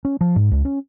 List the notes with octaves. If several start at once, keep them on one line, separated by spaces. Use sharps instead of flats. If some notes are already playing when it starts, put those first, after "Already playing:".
C#4
F3
G#2
C#2
C#4